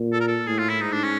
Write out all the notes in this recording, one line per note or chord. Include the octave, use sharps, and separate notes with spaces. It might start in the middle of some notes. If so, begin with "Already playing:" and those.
Already playing: A#2
A4
A#4
A4
A2 G#4
F4
E4
G#2 D#4
D4
C#4